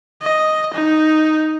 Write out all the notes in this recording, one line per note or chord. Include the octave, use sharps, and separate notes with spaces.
D#5
D#4